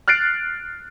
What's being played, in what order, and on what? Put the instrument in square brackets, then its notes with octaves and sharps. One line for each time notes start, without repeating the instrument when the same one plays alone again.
[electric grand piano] F6 F#6 A6 C7 D7